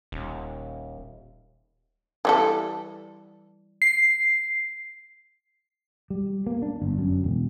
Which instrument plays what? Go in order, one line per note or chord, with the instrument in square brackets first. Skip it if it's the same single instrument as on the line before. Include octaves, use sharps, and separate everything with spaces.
[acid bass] D#1
[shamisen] E3 G3 A4
[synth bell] C7
[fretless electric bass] G3
A#3
D4
G1
F#2
E1